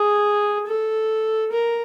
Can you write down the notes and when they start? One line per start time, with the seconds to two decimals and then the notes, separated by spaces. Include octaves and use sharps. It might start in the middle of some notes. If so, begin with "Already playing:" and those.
Already playing: G#4
0.67 A4
1.52 A#4